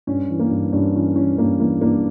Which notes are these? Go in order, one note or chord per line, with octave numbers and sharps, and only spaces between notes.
G2 C#4
E3
A#3
G2
G2 C#4
E3 C#4
E3 C#4
G2 A#3
E3 A#3
G2 A#3 D4